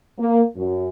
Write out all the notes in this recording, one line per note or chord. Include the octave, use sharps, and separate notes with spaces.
A#3
F#2